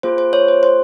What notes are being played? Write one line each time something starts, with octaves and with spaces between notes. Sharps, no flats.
A#3 F4 G#4 C5
C5
C#5
C5
C5